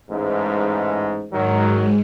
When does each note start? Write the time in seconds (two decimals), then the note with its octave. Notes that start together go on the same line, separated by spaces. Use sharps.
0.10 A1 G#2
1.32 G#2 D#3 F#3 G#3